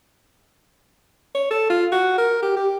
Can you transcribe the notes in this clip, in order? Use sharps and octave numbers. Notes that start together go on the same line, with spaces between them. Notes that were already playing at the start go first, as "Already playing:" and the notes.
C#5
A4
F4
F#4
A#4
G4
G4